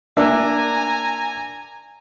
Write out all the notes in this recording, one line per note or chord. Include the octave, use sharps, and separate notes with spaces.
A#3 D4 E5 G#5 A#5